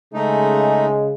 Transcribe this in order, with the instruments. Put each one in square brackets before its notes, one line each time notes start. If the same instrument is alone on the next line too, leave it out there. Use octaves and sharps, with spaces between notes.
[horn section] C#3 G#3 [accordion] A3 D#4